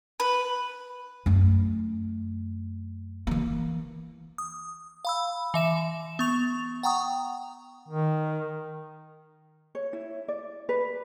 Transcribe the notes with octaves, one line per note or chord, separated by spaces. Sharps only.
B4
F#2 A3
E3 A#3
D#6
F5 B5 E6
E3 E5 E7
B3 C#6 F7
F#5 G5 A#5 C#6 D#6
D#3
C#5
E4
D5
B4